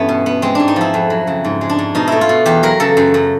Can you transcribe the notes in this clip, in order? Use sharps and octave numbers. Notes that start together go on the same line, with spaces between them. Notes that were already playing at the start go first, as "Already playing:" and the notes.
Already playing: G2 E3 A3 B3 C#4
B2
B3
G#3 C4
G#2 D4
D#4
F3 E4
F2
F#3
C#3
G#2
G#3
D4
G#2
B2 D#4
A3 E4
F4
B2
E2 G4
F#3 A#4
C#3 A4
F#2
F#2